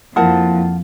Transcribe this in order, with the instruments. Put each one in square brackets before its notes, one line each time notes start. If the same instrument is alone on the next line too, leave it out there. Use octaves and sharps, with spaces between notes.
[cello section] F2 F3 [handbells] A#3 C4 E4 [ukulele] A#4 F#5 A5